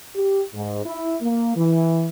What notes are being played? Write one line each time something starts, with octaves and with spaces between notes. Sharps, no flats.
G4
G#2
E4
A#3
E3